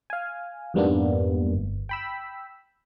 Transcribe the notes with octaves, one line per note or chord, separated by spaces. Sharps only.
F5 G#5
F2 G#2 G3 A#3 B3 D4
G1
G5 B5 E6